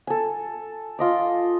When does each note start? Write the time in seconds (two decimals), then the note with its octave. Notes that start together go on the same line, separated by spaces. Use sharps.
0.07 A4 G#5
0.99 F4 D#5 D6